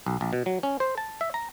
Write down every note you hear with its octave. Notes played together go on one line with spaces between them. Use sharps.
B1
A#1
B2
F#3
C#4
C5
A5
E5
A#5